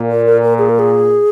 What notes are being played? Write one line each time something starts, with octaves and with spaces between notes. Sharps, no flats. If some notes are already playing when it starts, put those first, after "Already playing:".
Already playing: A#2
A#4
A#4
A#4
G#4
A#4
G#4